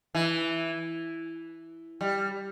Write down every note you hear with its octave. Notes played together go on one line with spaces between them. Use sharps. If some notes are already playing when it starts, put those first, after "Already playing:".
E3
G3